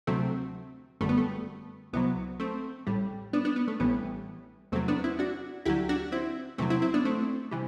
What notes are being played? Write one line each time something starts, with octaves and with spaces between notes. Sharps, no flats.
D2 C3 F#3 A3 C4
G1 F#2 D3 G3 A3
B3
A3
C2 C3 F#3 B3
A3 C4
A1 A2 G3
B3 D4
B3 D4
B3
A3
A1 A2 E3 G3 B3
E2 C3 F#3 A3 C4
B3 D4
C4 E4
D4 F#4
D2 D3 F#3 E4 G4
D4 F#4
C4 E4
E2 C3 F#3 A3 C4
C4 E4
C4 E4
B3 D4
A3 C4
C3 E3 G3